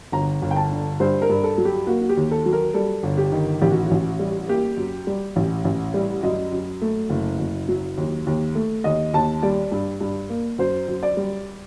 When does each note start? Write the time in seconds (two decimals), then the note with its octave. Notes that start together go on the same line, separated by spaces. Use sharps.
0.12 G1 A#5
0.42 G1
0.51 G5
0.56 A5
0.72 D3
1.00 G2 C5
1.22 A#4
1.30 G2
1.44 A4
1.58 F#3
1.65 G4
1.87 A#3 F#4
2.02 F#4
2.09 G4
2.17 D#2
2.31 A4
2.46 F#3
2.53 A#4
2.74 G3 A4
3.03 G1
3.18 G4
3.32 D#3
3.61 A1 G4
3.70 F#4
3.86 F#4
3.91 A1
4.19 G3
4.48 A#3 G4
4.77 F#2
5.07 G3
5.36 A1
5.65 A1
5.94 G3
6.23 F#2 D#5
6.52 F#2
6.82 A3
7.10 F#1
7.39 F#1
7.69 F#3
7.97 D#2
8.27 D#2
8.55 A3
8.84 D#2 D#5
9.13 D#2 A5
9.43 G3 D5
9.72 G2
10.01 G2
10.30 A#3
10.58 F#2 C5
10.88 F#2
11.03 D5
11.17 G3